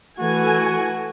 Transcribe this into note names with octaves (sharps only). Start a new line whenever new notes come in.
E3 A3 F#4 G#5